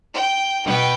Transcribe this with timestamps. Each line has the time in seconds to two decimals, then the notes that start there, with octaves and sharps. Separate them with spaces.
0.15 G5
0.66 B2 B3 G5